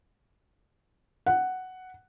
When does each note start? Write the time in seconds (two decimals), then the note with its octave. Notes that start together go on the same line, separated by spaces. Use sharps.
1.26 F#5